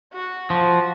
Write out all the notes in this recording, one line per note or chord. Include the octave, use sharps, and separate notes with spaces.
F#4
F3